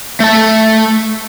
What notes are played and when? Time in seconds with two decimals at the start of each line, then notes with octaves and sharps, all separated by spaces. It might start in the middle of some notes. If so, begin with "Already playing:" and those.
0.20 A3 A5